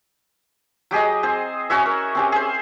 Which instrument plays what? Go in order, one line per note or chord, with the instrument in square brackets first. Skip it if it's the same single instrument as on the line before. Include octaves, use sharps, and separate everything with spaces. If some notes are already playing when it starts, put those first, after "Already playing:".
[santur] F#3 G4 G#4 D#5
C4 G#4 C5
C#4 F#4 C#5 E5
A#4
C4 C#4 G4
G#4 C5